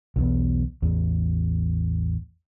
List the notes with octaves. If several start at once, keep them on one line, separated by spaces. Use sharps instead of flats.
B1 E2 B3
A1 E2